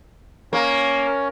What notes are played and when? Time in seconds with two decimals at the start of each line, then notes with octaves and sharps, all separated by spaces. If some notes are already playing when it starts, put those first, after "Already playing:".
0.53 A#3 C#4 C#5